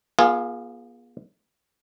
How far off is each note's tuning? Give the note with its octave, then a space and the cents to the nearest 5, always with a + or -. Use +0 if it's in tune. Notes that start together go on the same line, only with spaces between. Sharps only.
B3 -40 F4 +0 G#4 +0